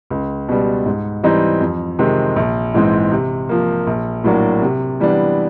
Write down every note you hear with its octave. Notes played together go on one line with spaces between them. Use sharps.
C#2
B2 G3
G#2
E3 G3 C4 D#4
F2
C3 D#3 G#3 C4
A#1
G#2 E3 G#3 C4
C3
F3 A#3
A#1
A2 F#3 A#3 D4
C3
E3 G3 B3 D4